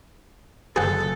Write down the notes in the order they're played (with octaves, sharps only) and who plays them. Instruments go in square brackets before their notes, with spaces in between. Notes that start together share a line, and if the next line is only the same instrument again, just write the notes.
[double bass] F#1 [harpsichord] G#4 F#5 [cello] A4